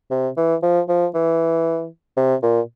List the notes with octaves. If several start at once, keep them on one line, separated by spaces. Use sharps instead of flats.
C3
E3
F3
F3
E3
C3
A#2